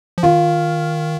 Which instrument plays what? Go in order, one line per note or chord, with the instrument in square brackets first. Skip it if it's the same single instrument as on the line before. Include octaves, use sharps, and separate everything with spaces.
[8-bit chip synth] F3
[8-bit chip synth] D#3 [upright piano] F4